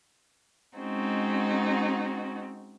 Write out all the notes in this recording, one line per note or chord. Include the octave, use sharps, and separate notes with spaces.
G#3 C4 C#4 D#4 F#4